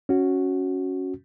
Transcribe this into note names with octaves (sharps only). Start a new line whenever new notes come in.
C#4 F#4